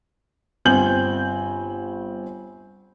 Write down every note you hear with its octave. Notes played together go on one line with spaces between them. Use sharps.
G1 C4 G#5 G6 F#7